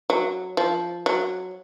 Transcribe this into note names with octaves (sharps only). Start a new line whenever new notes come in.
F#3
F3
F#3